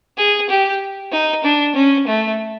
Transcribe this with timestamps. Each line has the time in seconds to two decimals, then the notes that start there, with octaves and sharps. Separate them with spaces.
0.18 G#4
0.50 G4
1.12 D#4
1.44 D4
1.75 C#4
2.08 A3